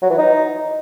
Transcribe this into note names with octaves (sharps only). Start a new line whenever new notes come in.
F#3
E3
D#4